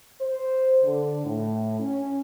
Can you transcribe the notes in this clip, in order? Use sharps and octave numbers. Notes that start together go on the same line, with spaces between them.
C5
D3
A2
C#4